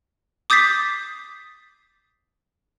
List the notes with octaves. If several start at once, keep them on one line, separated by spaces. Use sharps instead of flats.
D6 D#6 G6 A6 B6 C7